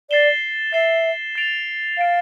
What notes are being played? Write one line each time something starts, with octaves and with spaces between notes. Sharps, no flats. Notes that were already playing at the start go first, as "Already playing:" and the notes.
D5 A6 C7 E7 G7
E5 A6 C7 E7 G7
A6 D7 F7
F5 A6 D7 F7